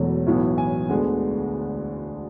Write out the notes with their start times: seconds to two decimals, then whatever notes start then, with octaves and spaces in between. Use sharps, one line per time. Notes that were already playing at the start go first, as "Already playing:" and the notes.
Already playing: E1 E2 B2 F#3 A3
0.27 B1 A2 E3 B3
0.58 G#5
0.89 D2 D3 G#3 B3